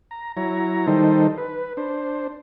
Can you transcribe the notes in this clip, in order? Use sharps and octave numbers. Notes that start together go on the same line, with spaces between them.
A#5
F#3 E4 C#5 A#5
D#3 G3 D#4 A4 C5
B4
D4 C5